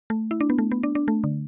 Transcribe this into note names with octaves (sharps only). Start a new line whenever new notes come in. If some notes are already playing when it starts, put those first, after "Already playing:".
A3
E4
D4
B3
A3
B3
D4
D4
A3
D3